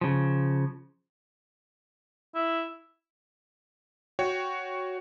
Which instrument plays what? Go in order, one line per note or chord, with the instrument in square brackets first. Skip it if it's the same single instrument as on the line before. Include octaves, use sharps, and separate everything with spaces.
[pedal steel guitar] C#3 F3
[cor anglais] E4
[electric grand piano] F#4 C#5 G5